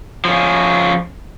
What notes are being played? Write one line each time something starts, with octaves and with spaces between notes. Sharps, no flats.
F3 C#4